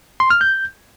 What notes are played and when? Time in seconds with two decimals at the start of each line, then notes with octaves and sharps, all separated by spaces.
0.20 C6
0.30 F6
0.41 G6